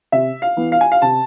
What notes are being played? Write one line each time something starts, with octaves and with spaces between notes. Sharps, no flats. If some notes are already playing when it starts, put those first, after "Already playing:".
C3 E5
F5
E3 B3
F5
G#5
F5
C3 A5